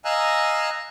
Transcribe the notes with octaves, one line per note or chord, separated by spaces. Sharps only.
D#5 F5 G#5 A#5 E6 F#6